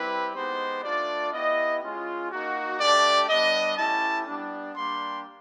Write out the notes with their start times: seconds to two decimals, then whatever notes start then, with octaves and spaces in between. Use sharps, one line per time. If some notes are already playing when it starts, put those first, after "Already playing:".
Already playing: G3 C4 E4 G4 B4
0.35 G#3 B3 D#4 G4 C5
0.84 A3 D4 F4 D5
1.33 B3 E4 G4 D#5
1.82 G#3 C#4 F4
2.31 A#3 D#4 F#4
2.80 A3 D4 G4 D5
3.29 G3 B3 D4 D#5
3.77 A3 C#4 E4 G4 A5
4.27 G3 B3 D4
4.75 G3 A#3 D4 G4 C6